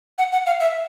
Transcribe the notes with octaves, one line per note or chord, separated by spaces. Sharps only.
F#5
F#5
F5
E5